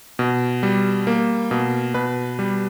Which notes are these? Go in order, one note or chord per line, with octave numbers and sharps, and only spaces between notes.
B2
G3
A#3
B2
B2 B4
G3